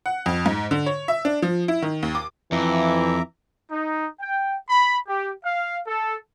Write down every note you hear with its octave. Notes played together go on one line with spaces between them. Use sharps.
F#5
F2
G#2
D3
C#5
E5
D4
F3
E4
D#3
D#2
D6
F2 E3 E5 A#5 D6
D#4
G5
B5
G4
F5
A4